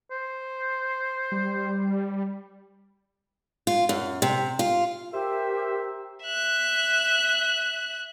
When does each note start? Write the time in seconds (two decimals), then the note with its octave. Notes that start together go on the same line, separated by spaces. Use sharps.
0.11 C5
1.32 G3
3.67 F4
3.89 F#2
4.22 C3
4.59 F4
5.13 G4 A#4 C5 E5
6.23 E5 F#6